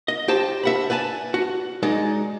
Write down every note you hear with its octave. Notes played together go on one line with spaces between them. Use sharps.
D#5
G4 C5 G5 A5
E5 F#5 B5
B4 D5 G#5 A5
F#4
G#3 D#4 D5 D#5